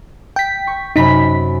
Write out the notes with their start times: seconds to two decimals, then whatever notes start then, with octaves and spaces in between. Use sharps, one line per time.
0.36 G5 B6
0.67 C#6
0.96 F#2 C3 D#4 B5 B6